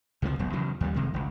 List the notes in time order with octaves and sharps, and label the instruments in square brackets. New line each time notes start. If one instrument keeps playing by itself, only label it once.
[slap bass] C#2 C3 D#3 F3
D#1 B1
E2 C#3 F#3
D#2 G3
F1 C3 D#3 G#3
G1 C#2